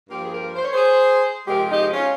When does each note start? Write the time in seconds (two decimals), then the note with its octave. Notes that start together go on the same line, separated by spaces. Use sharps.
0.10 G2 F3 A#3 G4 A#4
0.23 G#4
0.32 G4 A#4
0.56 C5
0.64 C#5
0.73 G#4 C5
1.48 C3 F3 G#3 G4 A#4
1.71 D#4 G4
1.93 C#4 F4